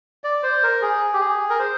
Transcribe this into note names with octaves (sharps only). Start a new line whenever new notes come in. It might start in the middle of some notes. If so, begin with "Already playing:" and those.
D5
C5
A#4
G#4
G4
G#4
A#4
C5